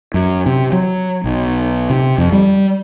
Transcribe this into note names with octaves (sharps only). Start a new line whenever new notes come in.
F#2
C3
F#3
B1
C3
F2
G3